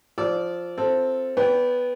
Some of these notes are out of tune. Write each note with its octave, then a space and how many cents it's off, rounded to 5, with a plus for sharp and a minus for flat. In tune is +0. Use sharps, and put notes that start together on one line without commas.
F3 +0 D5 -15 E6 +0
C4 +0 F4 +0 A4 +0
B3 +0 D5 -40 G5 +0